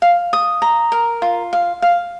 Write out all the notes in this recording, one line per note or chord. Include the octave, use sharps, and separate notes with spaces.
F5
D#6
A#5
A#4
F4
F5
F5